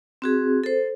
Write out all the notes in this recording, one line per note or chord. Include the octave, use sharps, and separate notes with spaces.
C4 F#4 G#4
A4 C5